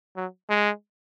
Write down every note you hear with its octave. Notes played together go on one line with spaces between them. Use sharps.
F#3
G#3